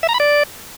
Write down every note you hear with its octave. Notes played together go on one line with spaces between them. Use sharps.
E5
A#5
B5
D5